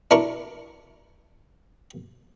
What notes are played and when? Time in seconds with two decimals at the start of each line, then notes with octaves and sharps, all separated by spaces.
0.11 D4 E4 A#4 C#6